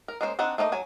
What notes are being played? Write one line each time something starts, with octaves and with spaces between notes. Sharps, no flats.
A#4
G#3 A#3 C#4 C5
C4 D4 D#4 C5 F#5
A3 A#3 D#4 D#5
F#3 G#5